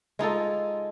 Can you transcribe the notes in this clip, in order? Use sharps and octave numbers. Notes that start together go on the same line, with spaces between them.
G#3 D#4 F4 A4